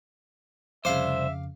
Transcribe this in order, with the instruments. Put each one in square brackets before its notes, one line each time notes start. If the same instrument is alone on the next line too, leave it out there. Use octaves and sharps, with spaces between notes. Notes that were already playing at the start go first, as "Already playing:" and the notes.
[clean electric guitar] C2 C5 [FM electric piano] F2 C#3 [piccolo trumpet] E5 [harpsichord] F5 D6